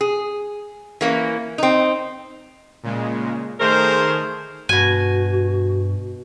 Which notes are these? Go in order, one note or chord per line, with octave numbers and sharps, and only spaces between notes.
G#4
E3 A#3 C#4
C4 D#4
A#2 C#3 G#3
D#3 A3 G#4 A#4 C5
G2 B2 F#4 G#5